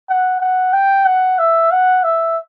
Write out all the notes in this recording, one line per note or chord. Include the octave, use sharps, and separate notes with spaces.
F#5
F#5
G5
F#5
E5
F#5
E5